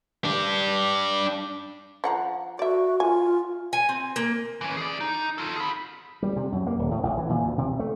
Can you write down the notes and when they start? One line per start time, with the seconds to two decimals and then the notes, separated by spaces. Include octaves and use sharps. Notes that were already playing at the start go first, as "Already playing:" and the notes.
0.25 D4 G4
2.04 F3 F#5 A#5
2.59 F#4 D5 E5
3.00 F4 G#5
3.73 G#5
3.89 C4
4.16 A#3
4.61 E3 C#4
4.77 G#4 D5
5.01 D#4
5.38 F4 A4
5.56 G#4 B5
6.23 G3
6.36 C3
6.52 F#2
6.67 A#3
6.79 D#1
6.91 A2
7.03 A1
7.17 E3
7.29 A#2
7.44 D2
7.58 C3
7.79 A3